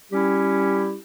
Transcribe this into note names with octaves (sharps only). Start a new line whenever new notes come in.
G3 C#4 E4 G4